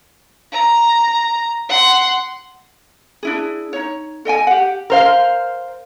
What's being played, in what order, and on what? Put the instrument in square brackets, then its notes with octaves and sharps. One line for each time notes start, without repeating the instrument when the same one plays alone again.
[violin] A#5
F#5 C6
[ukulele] D4 E4 G#4
D#4 C#5
A4 D#5 G5 G#5
G4 F#5
[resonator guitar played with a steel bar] A#4 C5 F5